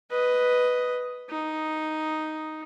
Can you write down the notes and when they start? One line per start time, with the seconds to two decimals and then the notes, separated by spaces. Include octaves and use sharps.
0.10 B4 D#5
1.30 D#4